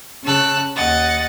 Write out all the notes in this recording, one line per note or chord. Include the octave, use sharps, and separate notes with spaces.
C#3 A5 E6 F#6
D#2 D#5 F#5 A6